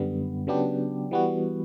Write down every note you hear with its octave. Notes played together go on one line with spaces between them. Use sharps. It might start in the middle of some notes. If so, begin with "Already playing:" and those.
Already playing: F#2 D3 G3 B3
C#3 F#3 B3 D4 G4
E3 G3 B3 F#4